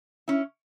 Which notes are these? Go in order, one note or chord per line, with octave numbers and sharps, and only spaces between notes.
C#4 E4